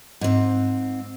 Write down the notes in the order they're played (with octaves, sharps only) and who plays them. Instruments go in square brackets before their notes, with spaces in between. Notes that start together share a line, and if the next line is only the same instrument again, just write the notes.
[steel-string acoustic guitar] G#2 C4